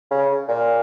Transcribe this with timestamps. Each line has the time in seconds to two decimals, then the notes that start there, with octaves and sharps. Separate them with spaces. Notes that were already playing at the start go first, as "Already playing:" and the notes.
0.11 C#3
0.48 A#2